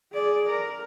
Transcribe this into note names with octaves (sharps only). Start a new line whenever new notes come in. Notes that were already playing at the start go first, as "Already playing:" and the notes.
G#4 D5
A#4